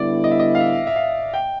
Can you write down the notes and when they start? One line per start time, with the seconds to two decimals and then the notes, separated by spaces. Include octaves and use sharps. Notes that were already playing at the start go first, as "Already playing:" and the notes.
Already playing: D3 G3 B3 E4 D5
0.24 D#5
0.31 E5
0.39 D#5
0.55 F5
0.60 E5
0.87 E5
0.96 F5
1.34 G5